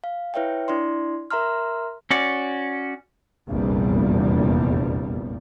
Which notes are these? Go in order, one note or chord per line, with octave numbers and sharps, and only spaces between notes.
F5
E4 B4 C#5 E5 G5
D4 E4 D5 C6
A#4 E5 A#5 C6 F6
C#4 F#4 D5
F1 A#1 E2 G3